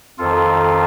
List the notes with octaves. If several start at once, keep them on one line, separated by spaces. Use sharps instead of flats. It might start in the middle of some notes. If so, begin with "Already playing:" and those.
F2 D#3 F4 A4